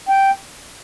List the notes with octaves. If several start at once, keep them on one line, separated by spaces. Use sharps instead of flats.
G5